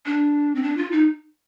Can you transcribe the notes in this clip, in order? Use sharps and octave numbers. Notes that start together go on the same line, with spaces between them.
D4
C4
D4
F4
D#4